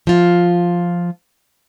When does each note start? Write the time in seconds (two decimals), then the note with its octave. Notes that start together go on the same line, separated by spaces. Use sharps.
0.07 F3 F4